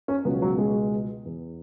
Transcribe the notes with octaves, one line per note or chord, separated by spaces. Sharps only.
C#4
C#2 B2 F#3 B3
F#3
G#3
E2 E3